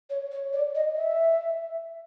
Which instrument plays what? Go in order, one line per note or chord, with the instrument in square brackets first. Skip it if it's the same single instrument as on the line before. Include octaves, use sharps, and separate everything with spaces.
[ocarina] C#5
C#5
D5
D#5
E5